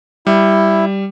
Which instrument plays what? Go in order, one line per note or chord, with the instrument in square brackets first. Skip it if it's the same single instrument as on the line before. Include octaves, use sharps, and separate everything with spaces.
[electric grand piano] G3 [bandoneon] E4